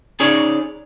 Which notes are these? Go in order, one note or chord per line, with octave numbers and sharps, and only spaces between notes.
C#4 D#4 G#4 C#5 D5